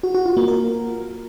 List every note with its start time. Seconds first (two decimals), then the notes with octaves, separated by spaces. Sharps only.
0.03 F#4
0.15 F#4
0.26 F4
0.37 A#3
0.48 A#4